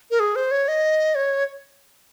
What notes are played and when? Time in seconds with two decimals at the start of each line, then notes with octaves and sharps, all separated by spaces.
0.11 A#4
0.20 G#4
0.36 C5
0.51 C#5
0.68 D#5
1.15 C#5